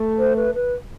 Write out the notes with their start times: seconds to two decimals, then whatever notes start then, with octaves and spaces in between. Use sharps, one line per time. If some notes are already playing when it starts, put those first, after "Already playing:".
Already playing: A3
0.19 C5
0.36 B4
0.55 B4